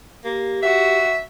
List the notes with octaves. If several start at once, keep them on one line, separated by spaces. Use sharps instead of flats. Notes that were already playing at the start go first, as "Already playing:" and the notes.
A#3 G4
F#4 E5